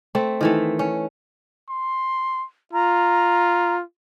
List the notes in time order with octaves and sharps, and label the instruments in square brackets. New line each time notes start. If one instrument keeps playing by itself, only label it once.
[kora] A3 C4
D#3 E3 A3
C#4
[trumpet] C6
[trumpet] F4 [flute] A#5